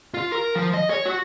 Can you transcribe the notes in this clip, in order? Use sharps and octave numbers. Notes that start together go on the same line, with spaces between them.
F4
A#4
F3
D#5
C#5
F#4